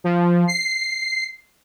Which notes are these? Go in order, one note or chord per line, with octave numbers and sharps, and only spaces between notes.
F3
C7